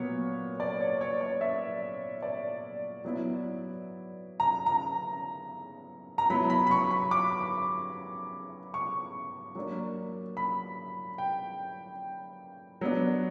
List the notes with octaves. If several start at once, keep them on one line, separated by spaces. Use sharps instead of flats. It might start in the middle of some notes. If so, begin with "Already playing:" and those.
Already playing: A#2 F#3 B3 C#5
D5
C#5
C#5
D5
E5
D5
F#3 B3 E4
A#5
A#5
A#5
F#3 B3 E4 B5
B5
B5
C#6
B5
D6
C#6
F#3 A#3 D4
B5
G5
F#3 B3 D4